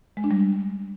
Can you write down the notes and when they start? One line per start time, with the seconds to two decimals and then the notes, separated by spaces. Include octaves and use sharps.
0.17 G#3
0.24 D4
0.31 G3